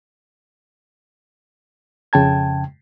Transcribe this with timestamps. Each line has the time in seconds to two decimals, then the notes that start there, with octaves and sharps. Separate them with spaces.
2.13 F2 C#3 G5 A5 G#6